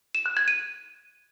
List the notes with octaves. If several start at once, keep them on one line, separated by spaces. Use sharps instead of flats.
E7
F#6
G#6
D#7